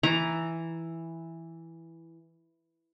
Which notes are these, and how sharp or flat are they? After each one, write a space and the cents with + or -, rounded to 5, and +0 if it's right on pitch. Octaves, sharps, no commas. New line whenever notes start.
E3 +0 A#5 +5